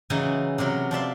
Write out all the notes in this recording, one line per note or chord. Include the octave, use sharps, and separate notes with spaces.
C#3 E3 F#3 D#4 E4 G#5
C3 E3 F#3 A#4
F3 D5 E5 C6